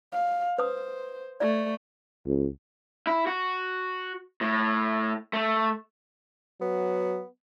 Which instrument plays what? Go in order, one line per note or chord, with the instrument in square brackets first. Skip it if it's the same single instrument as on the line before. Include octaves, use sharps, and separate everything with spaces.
[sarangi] F5
[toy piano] B4 D#6 [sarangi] C5
[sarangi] A3 [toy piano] D5
[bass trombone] C#2
[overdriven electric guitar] E4
F#4
A2
A3
[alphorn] F#3 [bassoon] B3